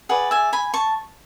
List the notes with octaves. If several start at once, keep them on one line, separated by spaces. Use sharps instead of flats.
G#4 B4 D5 F#5
E5 G#5
G#5 B5
A5 C#6